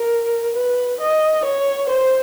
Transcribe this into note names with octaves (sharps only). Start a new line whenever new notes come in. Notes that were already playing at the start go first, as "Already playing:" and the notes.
Already playing: A#4
B4
D#5
C#5
C5